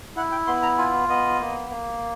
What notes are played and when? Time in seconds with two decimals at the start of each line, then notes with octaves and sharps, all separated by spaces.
0.16 E4 F#5
0.32 G5
0.47 B3 C6
0.63 A#5
0.78 F4 G#5
1.09 B3 D#5
1.40 A#3
1.70 A#3